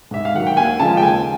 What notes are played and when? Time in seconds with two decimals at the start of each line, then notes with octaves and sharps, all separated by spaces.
0.11 G#2 E5
0.25 F5
0.34 D#3 F#3 F#5
0.47 G5
0.57 D#2 G#5
0.80 C#3 F3 G#3 A5
0.97 G5
1.02 D#2 G#5